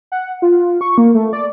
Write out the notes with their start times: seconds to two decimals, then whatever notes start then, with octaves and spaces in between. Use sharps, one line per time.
0.12 F#5
0.42 F4
0.81 C#6
0.98 A#3
1.14 A3
1.33 D5